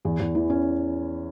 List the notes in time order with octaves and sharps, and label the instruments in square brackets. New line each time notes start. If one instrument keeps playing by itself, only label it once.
[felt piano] E2
E2
E3
C#4